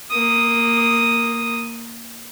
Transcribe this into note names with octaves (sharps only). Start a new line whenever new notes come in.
A#3 D#6